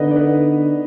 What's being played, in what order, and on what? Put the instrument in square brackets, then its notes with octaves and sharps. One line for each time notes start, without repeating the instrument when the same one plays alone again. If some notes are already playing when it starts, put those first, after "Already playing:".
Already playing: [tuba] D3 [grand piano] B3 D#4 B4 D#5
[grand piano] D5
B3 B4